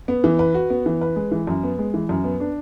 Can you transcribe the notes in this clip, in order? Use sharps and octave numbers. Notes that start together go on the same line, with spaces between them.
B3
E3
B4
F#4
B3
E3
B4
G#3
E3
F#2
B3
G#3
E3
F#2
B3
D4